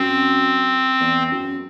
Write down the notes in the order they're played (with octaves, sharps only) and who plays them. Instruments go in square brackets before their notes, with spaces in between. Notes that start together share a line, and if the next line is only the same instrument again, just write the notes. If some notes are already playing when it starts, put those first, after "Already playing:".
Already playing: [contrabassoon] F#2 [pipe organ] C4
[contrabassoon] E2
F#2